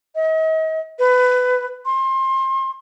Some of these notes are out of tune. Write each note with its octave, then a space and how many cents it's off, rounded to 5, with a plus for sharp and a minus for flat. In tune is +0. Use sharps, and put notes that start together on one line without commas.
D#5 +40
B4 +20
C6 +30